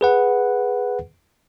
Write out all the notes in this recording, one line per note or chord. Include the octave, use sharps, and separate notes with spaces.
G#4 B4 F#5